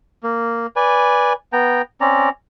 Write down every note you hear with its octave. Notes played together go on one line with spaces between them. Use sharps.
A#3
B4 D5 G#5
B3 G5 A#5
C4 C#4 D5 A#5